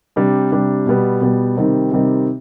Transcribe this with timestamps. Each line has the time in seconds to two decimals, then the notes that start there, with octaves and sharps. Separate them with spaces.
0.16 C3 G3 D4
0.51 C3 G3 D4
0.86 B2 G3 B3
1.21 B2 G3 B3
1.57 C3 D#3 G3 C4 D#4
1.91 C3 D#3 G3 C4 D#4